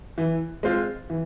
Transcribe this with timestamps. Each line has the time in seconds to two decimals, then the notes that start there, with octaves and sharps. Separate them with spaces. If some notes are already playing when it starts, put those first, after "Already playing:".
0.18 E3
0.63 G#3 C4 F4 C5
1.10 E3